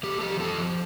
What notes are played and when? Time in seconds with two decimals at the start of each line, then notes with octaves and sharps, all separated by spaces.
0.03 A3 G4
0.21 F3 G4
0.40 F4 A4
0.58 F3